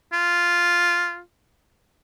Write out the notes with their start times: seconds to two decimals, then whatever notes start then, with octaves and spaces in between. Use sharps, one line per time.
0.13 F4